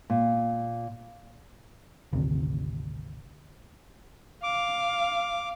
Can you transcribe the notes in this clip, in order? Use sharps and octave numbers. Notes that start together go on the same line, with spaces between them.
A#2
G#1 D2 C3
F5 D6